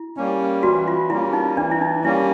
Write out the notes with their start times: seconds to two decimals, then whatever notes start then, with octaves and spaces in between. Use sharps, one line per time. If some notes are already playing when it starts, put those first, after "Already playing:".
Already playing: E4
0.17 G3 A#3 C#4
0.63 E3 F#4
0.88 F4
1.10 G3 A#3 C#4 E4
1.33 D#4
1.57 E3 D4
1.71 E4
1.82 D#4
2.04 G3 A#3 C#4 E4